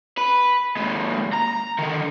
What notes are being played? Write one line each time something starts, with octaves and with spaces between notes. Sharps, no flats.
B4
D#2 G#3
A#5
D3 D#3